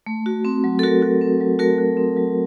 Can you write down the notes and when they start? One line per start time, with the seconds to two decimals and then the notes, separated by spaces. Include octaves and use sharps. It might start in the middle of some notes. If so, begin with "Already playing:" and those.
0.07 A3
0.26 F#4
0.45 C4
0.64 F#3
0.79 A4
0.83 A3 F#4 A#4
1.02 F#4
1.21 C4
1.41 F#3
1.59 A3 F#4 A#4
1.78 F#4
1.97 C4
2.17 F#3